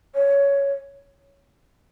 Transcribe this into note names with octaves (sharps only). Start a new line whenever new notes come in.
C#5